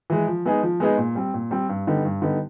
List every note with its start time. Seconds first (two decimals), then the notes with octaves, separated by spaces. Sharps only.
0.10 E3 G#3
0.27 F3
0.46 G#3 B3 D#4 G#4
0.63 F3
0.80 G#3 B3 D#4 G#4
0.98 A#2
1.15 G3 C4
1.34 A#2
1.51 G3 C4
1.69 G2
1.87 D3 G3 B3 D#4
2.05 G2
2.22 D3 G3 B3 D#4